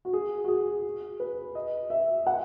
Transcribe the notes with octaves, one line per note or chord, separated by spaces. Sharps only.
F#4
G#4
F#4
G#4
B4
D#5
E5
F#5